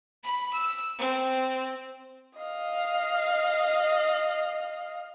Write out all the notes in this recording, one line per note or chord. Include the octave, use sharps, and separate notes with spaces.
B5
E6
C4
D#5 F5